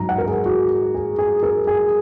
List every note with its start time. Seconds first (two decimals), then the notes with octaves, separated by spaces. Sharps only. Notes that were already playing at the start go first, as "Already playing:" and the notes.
Already playing: G#2 F#3 A#5
0.09 F#5
0.18 A#4
0.28 G#4
0.46 F#4
0.94 G#4
1.19 G#4
1.43 A#4
1.67 G#4